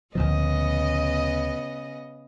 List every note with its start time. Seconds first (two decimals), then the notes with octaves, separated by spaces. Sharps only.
0.15 D2 A#2 C#3 F3 B3 D#5